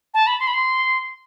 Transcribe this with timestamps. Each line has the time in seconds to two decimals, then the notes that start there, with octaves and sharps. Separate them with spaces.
0.14 A5
0.27 B5
0.40 C6
0.47 B5
0.54 C6